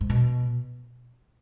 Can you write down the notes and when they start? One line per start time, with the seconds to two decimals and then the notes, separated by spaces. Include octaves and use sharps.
0.01 G#2
0.10 B2